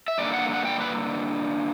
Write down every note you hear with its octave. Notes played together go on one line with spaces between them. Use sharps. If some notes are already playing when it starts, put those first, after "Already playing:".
E5
G2 D3 A#3 D5
F#5
F#5
G5
B4